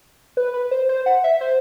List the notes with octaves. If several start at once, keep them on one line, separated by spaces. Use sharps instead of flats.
B4
B4
C5
C5
F#5
E5
C5